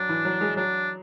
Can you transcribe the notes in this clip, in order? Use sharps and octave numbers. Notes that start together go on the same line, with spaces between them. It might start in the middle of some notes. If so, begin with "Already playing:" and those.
Already playing: F#3 D4
E3
F#3
G#3
F#3 D4